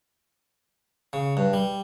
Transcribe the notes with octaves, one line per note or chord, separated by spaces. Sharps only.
C#3
G2
G3